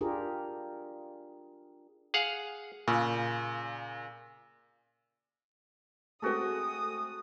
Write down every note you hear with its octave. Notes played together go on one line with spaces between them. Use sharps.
D4 F4 G4 G#4 A#4
G#4 F5 F#5
A#2 C#3
G#3 A3 C4 F#4 G#4 A4 D#6